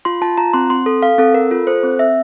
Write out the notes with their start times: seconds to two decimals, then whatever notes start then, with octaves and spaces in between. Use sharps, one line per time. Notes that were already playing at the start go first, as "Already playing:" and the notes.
0.05 F4 C6
0.22 F4 A5
0.38 F4 A#5
0.54 C4 C6
0.70 C4 C6
0.86 A4
1.02 A4 F5
1.18 C4 A4
1.34 A4 A#4
1.51 F4
1.67 A4 C5
1.83 C4
1.99 C4 E5